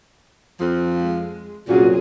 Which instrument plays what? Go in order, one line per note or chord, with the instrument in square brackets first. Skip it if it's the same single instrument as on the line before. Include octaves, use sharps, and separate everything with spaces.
[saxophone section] F2 F3
[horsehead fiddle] G#3
[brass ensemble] C2 F#2 F#3 [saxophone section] A#2 [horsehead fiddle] F4 G#4 [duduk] F#4